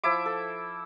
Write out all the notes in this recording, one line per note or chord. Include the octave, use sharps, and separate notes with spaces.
F3 E4 E5 D6
A4